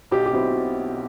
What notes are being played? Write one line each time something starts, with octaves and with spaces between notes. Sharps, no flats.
B1 G4
G4
B2 F#3 C4 E4